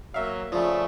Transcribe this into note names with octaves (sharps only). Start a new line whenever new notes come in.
F#3 A#3 E5 F5
C#3 F3 A3 F4 D5